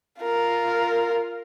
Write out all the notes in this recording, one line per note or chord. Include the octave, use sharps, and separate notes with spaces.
F4 A#4